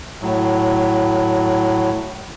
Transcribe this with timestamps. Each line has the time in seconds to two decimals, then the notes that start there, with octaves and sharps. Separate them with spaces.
0.22 A2 F#3